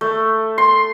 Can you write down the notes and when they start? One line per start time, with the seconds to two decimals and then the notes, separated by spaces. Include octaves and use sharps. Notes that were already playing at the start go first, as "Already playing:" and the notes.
0.01 A3
0.58 C6